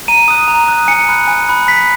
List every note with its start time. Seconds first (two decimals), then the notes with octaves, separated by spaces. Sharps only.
0.08 A#5 D#7
0.28 D#6 F#6
0.48 A#5
0.68 D#6 F#6
0.88 G#5 C#7
1.08 B5 F#6
1.28 G#5
1.48 B5 F#6
1.68 B5 B6